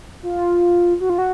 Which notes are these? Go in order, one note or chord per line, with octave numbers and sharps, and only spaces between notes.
F4
F#4
F4
F#4